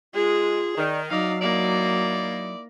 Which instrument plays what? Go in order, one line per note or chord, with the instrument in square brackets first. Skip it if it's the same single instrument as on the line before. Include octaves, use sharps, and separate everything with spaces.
[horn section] G#3 [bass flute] F4 [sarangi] G#4
[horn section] D#3 [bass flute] D5
[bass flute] F#3 [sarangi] D#4 [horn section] D5 E5 F5
[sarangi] A#3 [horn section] D#4 E4 D5